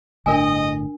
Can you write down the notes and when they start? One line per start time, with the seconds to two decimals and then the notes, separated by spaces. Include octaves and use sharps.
0.26 G1 A2 D3 D4 A#4 D#5 G#5